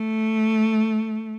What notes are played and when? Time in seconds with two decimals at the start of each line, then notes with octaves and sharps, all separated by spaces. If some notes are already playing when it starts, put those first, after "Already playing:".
Already playing: A3